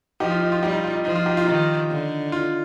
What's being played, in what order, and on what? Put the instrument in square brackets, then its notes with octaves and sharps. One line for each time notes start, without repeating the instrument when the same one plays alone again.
[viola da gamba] F3 [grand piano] D#4 G4
[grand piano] F4
D#4
F4
[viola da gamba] G3 [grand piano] D#4 G4
[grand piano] D#4
F4
D#4
[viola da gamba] F3 [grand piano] D#4
[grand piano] F4
D#4 G4
F4
[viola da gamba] D#3 [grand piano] D#4
[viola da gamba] D3
[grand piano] F4